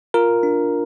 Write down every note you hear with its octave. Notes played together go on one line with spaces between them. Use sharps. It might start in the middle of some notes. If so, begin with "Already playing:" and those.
F4 A#4
D4